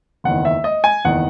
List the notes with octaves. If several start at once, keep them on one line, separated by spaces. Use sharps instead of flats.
F#1 E2 D#3 F#5
E5
D#5
G#5
F#1 E2 D#3 F#5